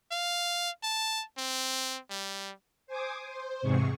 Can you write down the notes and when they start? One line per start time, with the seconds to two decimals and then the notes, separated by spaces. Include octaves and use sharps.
0.12 F5
0.83 A5
1.38 C4
2.10 G3
2.87 C5 G#5 D6 D#6
3.25 C5
3.62 E2 G#2 C3 G#3 C#6